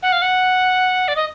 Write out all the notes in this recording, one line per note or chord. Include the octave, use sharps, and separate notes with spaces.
F#5
F5
F#5
D5
D#5